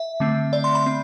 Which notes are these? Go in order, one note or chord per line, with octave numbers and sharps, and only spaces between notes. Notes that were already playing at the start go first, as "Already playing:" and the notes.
Already playing: E5
D3 A3 C4
D5
C6
B5
C4